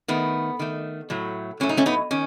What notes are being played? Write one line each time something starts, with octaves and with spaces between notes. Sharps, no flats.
D#3 A3 B3
D#3 A3
A2 F#3 A3
A2 F#3 A3 C#4
D#4
A3 C#4
B3 D#4
D#3 C#4